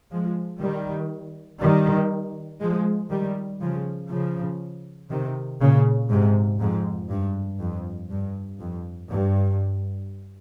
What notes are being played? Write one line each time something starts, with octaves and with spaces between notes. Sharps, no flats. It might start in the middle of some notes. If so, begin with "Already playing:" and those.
F3 G#3
D#3 G3
D#3 G3
F3 G#3
D#3 G3
C#3 F3
C#3 F3
C3 D#3
A#2 C#3
G#2 C3
F2 G#2
G2
F2
G2
F2
G2